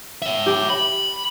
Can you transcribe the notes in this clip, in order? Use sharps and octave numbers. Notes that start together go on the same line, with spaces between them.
C#5 E5
G4
B5